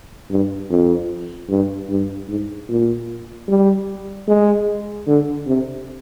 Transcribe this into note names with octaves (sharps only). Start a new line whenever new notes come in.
G2
F2
G2
G2
G#2
A#2
G3
G#3
D3
C3